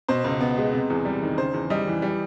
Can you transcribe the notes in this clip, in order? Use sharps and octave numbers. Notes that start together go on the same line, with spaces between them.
B2 C5
C#2
B3
G#3
C3
E2
G3
D#3
C#3 C5
E2
G3 D#5
E3
G3